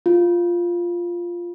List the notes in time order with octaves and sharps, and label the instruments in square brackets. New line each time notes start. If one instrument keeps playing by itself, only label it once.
[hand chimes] F4